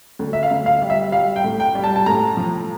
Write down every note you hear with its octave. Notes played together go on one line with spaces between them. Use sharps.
D2
E5
F5
D2
F5
G3
E5
G3 F5
G5
A2
G5
G3
A5
A5
A2 A#5
F3